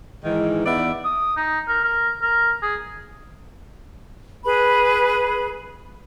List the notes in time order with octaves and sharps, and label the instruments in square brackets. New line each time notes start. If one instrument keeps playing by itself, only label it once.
[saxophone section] G#2 D#3 E3
E2 B3 D#4 D5 E5 F#5
[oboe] D#6
D#4
A#4
A#4
A#4
G#4
[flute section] G#4 B4 B5